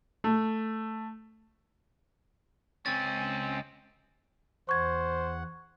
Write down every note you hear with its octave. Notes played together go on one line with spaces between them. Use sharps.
A3
C#2 C4 C#4 A6
E2 C5 F#5 C#6 G#6